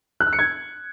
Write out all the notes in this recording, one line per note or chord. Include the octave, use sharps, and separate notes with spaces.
F#6
E6
C#7
G#6